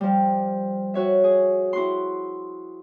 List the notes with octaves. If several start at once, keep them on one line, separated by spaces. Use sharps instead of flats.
F3 G3
F#4 C#5 E5
G#4
E4 F#4 C6